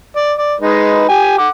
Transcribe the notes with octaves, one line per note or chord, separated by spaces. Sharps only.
D5
D5
G#3 D#4 B4
G4 G#5
F#5 D6